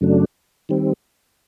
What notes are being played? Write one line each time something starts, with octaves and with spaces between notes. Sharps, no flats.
F#2 C#3 F#3 A3 D4
D#3 G3 C4